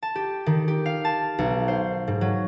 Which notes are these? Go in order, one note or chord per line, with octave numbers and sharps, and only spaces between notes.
A5
G4
D#3
G4
F5
A5
B1
C5
G#2
F#3